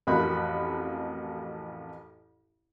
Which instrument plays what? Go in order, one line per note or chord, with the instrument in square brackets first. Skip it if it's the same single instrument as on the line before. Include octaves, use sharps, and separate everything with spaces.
[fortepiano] A1 F2 F#4 A#4 B5 F#6